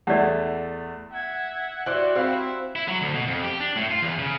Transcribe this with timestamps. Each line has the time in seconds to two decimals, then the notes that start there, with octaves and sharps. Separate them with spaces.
0.07 E2 A3 D5 F#5
1.12 E5 F#5 G#6
1.86 E4 F#4 G4 C5 D5 F#6
2.15 C4 E4 C5 F5
2.76 E4
2.88 F#3
3.02 D2
3.14 B2
3.27 F2
3.43 G4
3.60 D4
3.76 A2
3.91 F4
4.02 E2
4.19 C#3